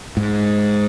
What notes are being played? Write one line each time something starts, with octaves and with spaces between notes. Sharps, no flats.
G#2